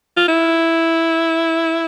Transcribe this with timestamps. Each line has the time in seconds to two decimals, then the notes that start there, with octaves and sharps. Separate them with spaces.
0.17 F4
0.28 E4